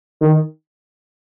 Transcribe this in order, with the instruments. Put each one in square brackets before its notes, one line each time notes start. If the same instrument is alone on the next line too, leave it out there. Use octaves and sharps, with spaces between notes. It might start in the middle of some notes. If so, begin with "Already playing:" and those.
[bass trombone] D#3